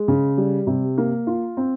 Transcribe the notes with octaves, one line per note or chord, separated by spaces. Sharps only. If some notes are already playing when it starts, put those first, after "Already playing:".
Already playing: G#3
C#3
G3
C3
A#3
F4
C4